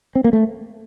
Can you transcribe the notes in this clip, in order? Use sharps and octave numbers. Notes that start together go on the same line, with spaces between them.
C4
A#3
A3